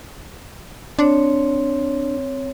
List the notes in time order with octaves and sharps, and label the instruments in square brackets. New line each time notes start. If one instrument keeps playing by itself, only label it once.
[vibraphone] C4 C#5 [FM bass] D4